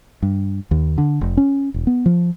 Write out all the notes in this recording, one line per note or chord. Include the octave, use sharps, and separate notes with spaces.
G2
D#2
D3
F1
C#4
E1
B3
F3